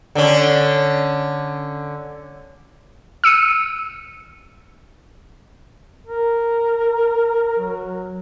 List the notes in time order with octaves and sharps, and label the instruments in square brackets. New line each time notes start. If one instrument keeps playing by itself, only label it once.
[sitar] D3 C#4
[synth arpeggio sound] E6 C#7 D#7
[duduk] A#4
F#3